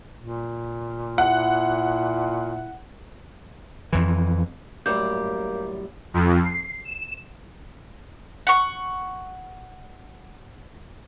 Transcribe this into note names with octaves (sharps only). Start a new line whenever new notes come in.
A#2
E4 F#5
F2 E3
F#2 A2 G3 A#3 D6 G6
F2
C7
E7
F#5 C#6